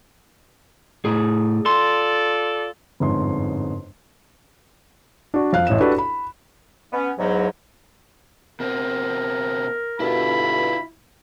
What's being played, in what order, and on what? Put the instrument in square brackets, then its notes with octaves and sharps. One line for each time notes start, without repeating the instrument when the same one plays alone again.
[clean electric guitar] A2 G#4
[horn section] F4 A4 D5 [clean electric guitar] C6
[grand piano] G1 F2 G#2 C#5 C6
[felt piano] D4 F#4
F2 F5 F#6
A1 A2 D#5 E7
D4 F#4 G4 A4 B4
B5
[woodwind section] B3 C#4
E2 G#2 F#3
[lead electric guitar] B2 C4 [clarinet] A#4
[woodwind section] G2 B2 D3 [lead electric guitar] E4 F4 [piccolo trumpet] B5